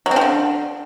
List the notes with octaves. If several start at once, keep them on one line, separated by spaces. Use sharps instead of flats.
F#3
C4
F3
D3